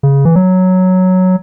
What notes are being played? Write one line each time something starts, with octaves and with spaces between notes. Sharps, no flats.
C#3
E3
F#3